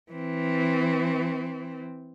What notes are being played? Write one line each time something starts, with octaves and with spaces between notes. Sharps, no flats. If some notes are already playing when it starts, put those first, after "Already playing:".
E3 C4